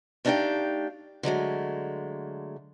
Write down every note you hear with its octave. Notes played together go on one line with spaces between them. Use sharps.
A3 D4 D#4 G4 F5 G5
D3 F#3 G#3 A3